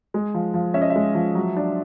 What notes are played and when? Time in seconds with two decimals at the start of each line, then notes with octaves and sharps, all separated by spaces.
0.14 G#3
0.34 F3
0.54 F3
0.74 C#4 E5
0.82 D#5
0.90 E5
0.96 G#3
1.15 F3
1.35 F#3
1.57 D4